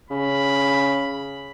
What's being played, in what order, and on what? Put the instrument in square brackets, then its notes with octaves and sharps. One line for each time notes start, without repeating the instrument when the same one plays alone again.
[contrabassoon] C#3 [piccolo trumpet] B5